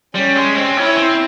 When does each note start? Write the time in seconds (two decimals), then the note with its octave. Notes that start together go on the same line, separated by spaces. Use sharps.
0.15 G3 C#4
0.36 G#3
0.56 C4
0.77 C#4 E4
0.97 C4